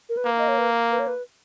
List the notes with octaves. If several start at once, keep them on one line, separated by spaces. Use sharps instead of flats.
A#4
B4
A#3
D#5
C#5
B4
B4
C#5
B4